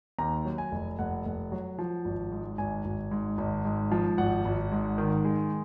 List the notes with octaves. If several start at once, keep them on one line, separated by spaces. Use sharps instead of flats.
D#2 A#5
F#3
G#5
F1
F1 F#5
F1
F#3
F3
G#1
G#2
G#1 G#5
G#1
G#2
G#1
G#2
F3
G#1 F#5
G#1
G#2
D#3
G#3